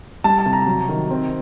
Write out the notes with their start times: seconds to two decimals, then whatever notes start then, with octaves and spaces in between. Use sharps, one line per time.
0.24 G3 A5
0.38 A5
0.46 C3
0.53 A#5
0.66 F#3
0.89 D#3
1.11 C4